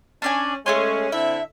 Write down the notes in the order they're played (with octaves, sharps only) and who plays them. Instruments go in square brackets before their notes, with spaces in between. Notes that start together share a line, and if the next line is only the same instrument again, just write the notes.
[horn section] C#4 [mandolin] D4 D5 G#5
[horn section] G#3 C#4 [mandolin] A3 G#4 C6
[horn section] D3 C4 E4 [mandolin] E5